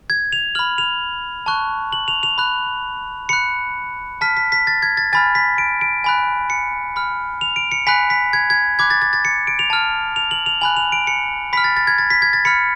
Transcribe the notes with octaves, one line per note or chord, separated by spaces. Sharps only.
G#6
F7
B5 F6 F#7
F7
A5 C#6 F#6
F#7
F7
F7
B5 F#6
B5 F#6 C#7
A5 F6 B6
B6
B6
A6
G#6
A6
G#5 B5 F6 A6
B6
D7
D7
G#5 B5 F#6
C#7
B5 F6
F7
D7
C#7
G#5 B5 F#6 B6
B6
G#6
G#6
B5 D6 F#6 G#6
A6
A6
A6
C#7
D7
F7
A5 F6
F7
F#7
F7
G#5 B5 F#6 F#7
F7
D7
C#7
B5 F6 B6
A6
A6
G#6
A6
B6
G#6
A6
B5 F6 C#7